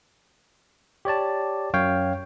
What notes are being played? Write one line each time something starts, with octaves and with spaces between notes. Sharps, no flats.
G4 C#5 D5 A5
F#2 C#5 F5 G5